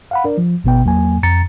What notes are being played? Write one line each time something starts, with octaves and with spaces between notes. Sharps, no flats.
F5 F#5 B5
D4 A#4 D5
F3
G#1 B2 B3 G5
E2 F#3 A#3 G#5
F2 A#5 A6 C#7